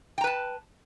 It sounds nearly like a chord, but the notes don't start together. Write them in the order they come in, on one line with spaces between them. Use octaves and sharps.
G5 A#5 B4 A5